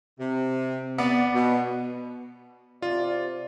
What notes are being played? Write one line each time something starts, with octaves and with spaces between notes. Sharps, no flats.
C3
B3 D5
B2
C3 F4 D5